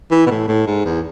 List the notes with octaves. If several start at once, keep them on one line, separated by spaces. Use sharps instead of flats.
E3
B2
A2
A2
G#2
E2